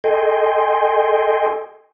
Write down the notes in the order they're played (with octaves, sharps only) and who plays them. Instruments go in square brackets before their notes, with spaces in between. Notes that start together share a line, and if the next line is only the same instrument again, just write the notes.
[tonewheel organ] A4 D#5 G5 G#5 C6